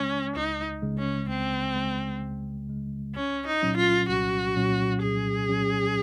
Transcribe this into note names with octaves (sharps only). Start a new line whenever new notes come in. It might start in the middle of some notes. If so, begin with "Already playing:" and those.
Already playing: C#2 C#3 G#3 C#4
C#2 D#4
C#3 G#3
C#4
C#2 C4
C#3 G#3
C#2
C#3 G#3
C2 C#4
D#4
A#2 F#3 C#4
F4
C2 F#4
A#2 F#3 C#4
C2 G#4
A#2 F#3 C#4